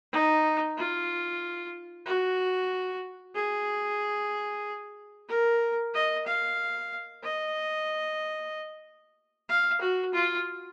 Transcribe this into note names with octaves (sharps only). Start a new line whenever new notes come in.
D#4
F4
F#4
G#4
A#4
D#5
F5
D#5
F5
F#4
F4